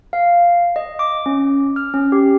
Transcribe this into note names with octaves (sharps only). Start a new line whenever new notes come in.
F5
D#5
D6
C#4
F6
C#4
G4